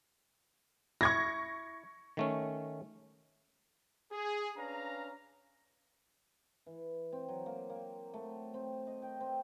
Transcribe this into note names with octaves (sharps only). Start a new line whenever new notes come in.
E4 C#6 G#6 A#6
D#3 A3 C#4
G#4
C#4 D4 B4 F5 A#5
E3
C4
F#3
A#3
A#3
A3
C4
D#5
G5
C4